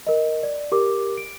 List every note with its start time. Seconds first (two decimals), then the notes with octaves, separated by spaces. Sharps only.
0.07 A#4 D#5
0.43 D5
0.72 G4 A#4 D6
1.18 D7